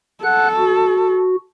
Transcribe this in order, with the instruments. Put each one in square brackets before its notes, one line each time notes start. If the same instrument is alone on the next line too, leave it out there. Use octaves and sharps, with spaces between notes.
[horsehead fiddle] A4 [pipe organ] F#5 F#6
[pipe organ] F#4